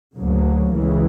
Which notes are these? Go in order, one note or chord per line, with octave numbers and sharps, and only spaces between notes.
D2 C#3 F#3 A#3
C#2 C#3 E3